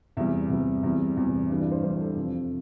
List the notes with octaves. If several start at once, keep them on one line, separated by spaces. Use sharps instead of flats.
E2 C3 G3 E5
E2 C3 G3
E2 C3 G3
E2 C3 G3
G2 E3 G3
D5
C5
G2 E3 G3 C5
A4
F2 C3 F3